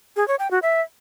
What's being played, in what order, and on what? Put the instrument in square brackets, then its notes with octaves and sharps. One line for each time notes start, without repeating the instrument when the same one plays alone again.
[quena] G#4
C#5
G5
F#4
E5